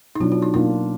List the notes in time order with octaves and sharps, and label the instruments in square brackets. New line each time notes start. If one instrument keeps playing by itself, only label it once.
[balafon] D#4
[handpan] B2 F#3 D4 [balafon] F4
[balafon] F4
D#4
[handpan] B2 A#3 D4 F4 [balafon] D#4